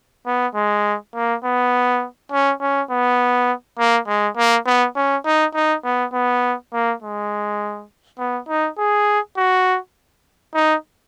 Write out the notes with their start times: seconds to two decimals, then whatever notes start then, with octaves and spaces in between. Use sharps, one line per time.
0.26 B3
0.55 G#3
1.14 A#3
1.44 B3
2.32 C#4
2.61 C#4
2.90 B3
3.79 A#3
4.08 G#3
4.37 A#3
4.66 B3
4.96 C#4
5.25 D#4
5.54 D#4
5.84 B3
6.13 B3
6.73 A#3
7.02 G#3
8.19 B3
8.49 D#4
8.78 G#4
9.37 F#4
10.54 D#4